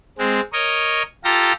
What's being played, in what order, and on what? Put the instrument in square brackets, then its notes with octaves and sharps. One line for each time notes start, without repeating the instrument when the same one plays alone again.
[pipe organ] G#3 C4
A#4 C#5 D#5
F4 G4 A4 A#5